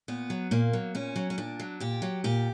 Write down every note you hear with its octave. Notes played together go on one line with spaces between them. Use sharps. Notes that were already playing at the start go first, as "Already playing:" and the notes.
A#2 B3
F#3
A#2 A#3
F#3
A#2 C#4
F#3
C#4
A#2 D4
F#3
A#2 G4
F#3
A#2 G4